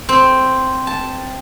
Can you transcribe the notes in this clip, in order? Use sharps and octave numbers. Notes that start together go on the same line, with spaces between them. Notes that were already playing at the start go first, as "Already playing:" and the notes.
C4
A5